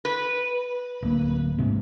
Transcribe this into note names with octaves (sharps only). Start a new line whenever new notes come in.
B4
D1 A#3
A1 G#2 C3